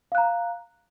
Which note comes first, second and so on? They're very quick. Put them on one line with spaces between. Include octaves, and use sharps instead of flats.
F5 F#6 A#5